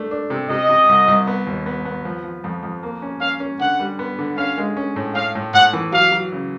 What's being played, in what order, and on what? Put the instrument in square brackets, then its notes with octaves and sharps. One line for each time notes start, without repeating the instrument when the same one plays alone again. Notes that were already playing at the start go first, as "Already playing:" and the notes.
Already playing: [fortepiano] A3 D4
D4
C3
[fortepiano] C3 [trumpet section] D#5
[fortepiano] C3
C2
C2
B3
D#2
B3
B3
F3
F3
F2
F2
A#3
C#4
[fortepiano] C#4 [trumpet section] F5
[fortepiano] C#4
[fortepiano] D3 [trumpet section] F#5
[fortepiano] G3
B3
D3
[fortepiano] C#4 [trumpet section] F5
[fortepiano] G#3
C#4
A2
[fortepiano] A2 [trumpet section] F5
[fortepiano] A2
[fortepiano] A2 [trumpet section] F#5
[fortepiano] E3
[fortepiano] F#3 [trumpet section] F5
[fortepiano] F#3
C#3